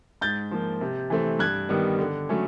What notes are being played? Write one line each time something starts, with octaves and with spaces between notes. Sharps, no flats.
G#2 G6 A6
F3 A#3
C3
E3 A3 C4
G2 F#6 G#6
D#3 G3 B3
D3
F#3 A3 C#4